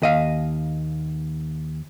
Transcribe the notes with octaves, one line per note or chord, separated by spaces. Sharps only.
D#2 D#5 F5